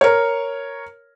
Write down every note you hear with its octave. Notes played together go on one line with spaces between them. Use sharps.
A#4 C#5